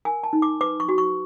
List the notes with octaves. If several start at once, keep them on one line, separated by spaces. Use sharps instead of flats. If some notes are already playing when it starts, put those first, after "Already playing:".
A#4 G#5
A5
D#4
D6
B4 D6
C#6
F#4
C#6